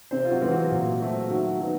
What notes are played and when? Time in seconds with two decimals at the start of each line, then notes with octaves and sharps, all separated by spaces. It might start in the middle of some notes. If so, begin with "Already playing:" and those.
0.11 C3 C4 C5
0.25 F4
0.31 F#3 F#4
0.41 E3 G#3 C4
0.51 F#3 F#4
0.71 A#2
1.02 F#3 A3 C4
1.30 D#3 F#3 F#4
1.61 F#3 B3 D#4